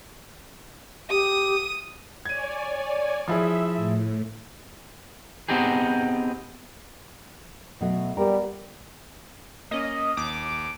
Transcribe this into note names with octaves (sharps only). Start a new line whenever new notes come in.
G4 D#6
C#5 D5 G#5 G#6 D#7
F3 E4 G#4 E5
A2
B3 C4 D#4 G4 G#4
B2 F#3 A3
G3 B3 A#4
A#3 C#4 D#5
D#2 D6